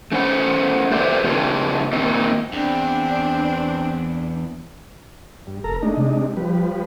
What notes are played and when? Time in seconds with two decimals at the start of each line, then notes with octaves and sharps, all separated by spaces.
0.12 A3 C#4 C5 F#5
0.92 G4 A4 B4 C5 D5 E5
1.24 C#3 C4 D4 F4 G4 G#4
1.93 A#2 D#3 C4 D#4
2.52 E2 C4 D4
5.47 G2
5.64 F1 A4 A#4 A#5
5.82 G#3 A3 D4 D#4
5.97 C3
6.37 F3 G3 B4